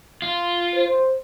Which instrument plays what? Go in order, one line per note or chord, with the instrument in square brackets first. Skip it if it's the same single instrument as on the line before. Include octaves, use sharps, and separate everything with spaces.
[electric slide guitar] F4
[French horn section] C5